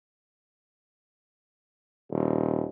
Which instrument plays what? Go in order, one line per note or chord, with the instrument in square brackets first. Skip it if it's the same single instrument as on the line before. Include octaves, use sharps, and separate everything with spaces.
[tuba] D#1